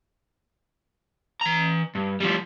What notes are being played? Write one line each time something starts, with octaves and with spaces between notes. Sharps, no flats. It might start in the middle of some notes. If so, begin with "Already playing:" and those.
E3 A#5
G2
F3 G3